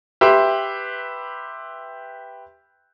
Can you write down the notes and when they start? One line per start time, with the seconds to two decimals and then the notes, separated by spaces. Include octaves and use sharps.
0.21 G4 B4 E5 C6